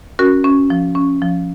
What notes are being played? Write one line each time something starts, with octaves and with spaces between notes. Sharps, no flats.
C#4 F#4 A#4
C#4
F3
C#4
F3